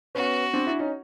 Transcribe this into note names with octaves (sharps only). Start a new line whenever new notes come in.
B3 C#4 F#4
C4 D4
D4 E4
C#4 D#4